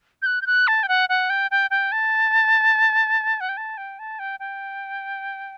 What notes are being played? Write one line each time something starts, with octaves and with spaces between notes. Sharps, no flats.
G6
F#6
G6
F#6
A5
G5
F#5
F#5
G5
G5
G5
A5
F#5
G5
A5
G5
A5
G5
G5